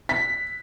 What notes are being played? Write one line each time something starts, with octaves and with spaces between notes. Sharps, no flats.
B6